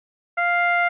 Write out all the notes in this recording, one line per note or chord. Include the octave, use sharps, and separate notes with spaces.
F5